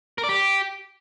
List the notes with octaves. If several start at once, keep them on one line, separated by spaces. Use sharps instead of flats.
A#4
D5
G4